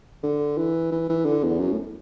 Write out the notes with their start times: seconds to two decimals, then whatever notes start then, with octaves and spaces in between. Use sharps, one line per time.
0.23 D3
0.57 E3
0.91 E3
1.09 E3
1.25 D3
1.43 E2
1.59 F#2
1.72 A2